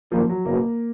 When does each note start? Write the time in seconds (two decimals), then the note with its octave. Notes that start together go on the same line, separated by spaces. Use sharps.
0.12 G1 F#2 D#3 F3 G3 A#3
0.29 F#3
0.45 F#1 E2 B2 A#3